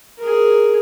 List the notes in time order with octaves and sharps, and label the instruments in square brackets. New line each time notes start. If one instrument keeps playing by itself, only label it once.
[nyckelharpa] G#4 A#4